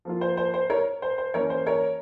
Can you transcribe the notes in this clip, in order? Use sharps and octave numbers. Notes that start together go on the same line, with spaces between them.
F3 A#3 F4
C5
C5
C5
A#4 C#5
C5
C5
E3 A#3 C#4 A#4 C#5
C5
A#4 C#5